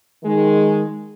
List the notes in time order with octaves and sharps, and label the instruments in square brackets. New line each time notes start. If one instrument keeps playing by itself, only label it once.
[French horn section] D#3 G#3